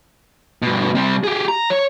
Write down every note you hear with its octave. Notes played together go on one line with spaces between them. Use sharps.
G2 B2
C3 G3
G4 G#4
A#5
C#5